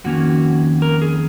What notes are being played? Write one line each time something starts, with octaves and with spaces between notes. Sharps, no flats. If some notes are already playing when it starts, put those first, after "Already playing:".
F2 D#3 A#3 C#4 F#4
A#4
G#4